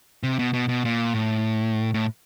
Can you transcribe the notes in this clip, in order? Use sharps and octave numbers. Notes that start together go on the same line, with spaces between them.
C3
B2
B2
B2
A#2
A2
A2